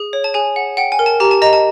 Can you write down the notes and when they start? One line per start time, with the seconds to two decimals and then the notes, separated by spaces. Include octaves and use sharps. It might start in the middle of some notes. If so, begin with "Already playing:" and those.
Already playing: G#4
0.13 C#5
0.24 A5
0.34 G#4 G#5
0.56 F#5
0.77 F#5 G5
0.92 G#5
0.99 A#4
1.06 A5
1.20 G4 A#5
1.31 A5
1.42 D#5 A#5
1.53 A5